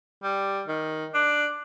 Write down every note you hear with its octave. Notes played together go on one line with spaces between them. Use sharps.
G3
D#3
D4